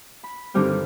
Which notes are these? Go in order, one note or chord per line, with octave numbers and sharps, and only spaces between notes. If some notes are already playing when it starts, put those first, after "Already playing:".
B5
G2 D3 D#3 G3 C4